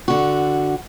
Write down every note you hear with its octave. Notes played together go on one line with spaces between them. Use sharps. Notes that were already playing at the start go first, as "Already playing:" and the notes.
D3 F#4